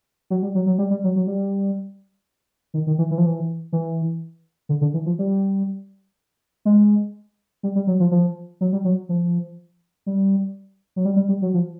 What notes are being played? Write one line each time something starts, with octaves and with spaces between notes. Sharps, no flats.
F#3
G3
F#3
F#3
G3
G3
F#3
F#3
G3
D#3
D#3
E3
E3
F3
E3
E3
D3
D3
E3
F3
G3
G#3
G3
G3
F#3
F3
F3
F#3
G3
F#3
F3
G3
F#3
G3
G3
G3
F#3
F3